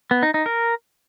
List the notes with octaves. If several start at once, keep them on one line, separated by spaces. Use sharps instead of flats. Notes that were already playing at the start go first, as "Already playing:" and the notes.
B3
D#4
D#4
A#4